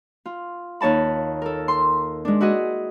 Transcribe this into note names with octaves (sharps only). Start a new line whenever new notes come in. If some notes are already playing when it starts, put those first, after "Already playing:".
F4
D#2 D#4 C#5 A5 B5
A4 A#4
C6
G#3 D4
E4 F#4 G#4 D#5